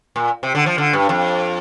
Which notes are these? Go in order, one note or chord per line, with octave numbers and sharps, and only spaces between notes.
A#2
C3
D3
F3
D3
G2
F2